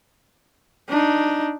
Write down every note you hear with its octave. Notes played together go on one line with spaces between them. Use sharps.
D4 D#4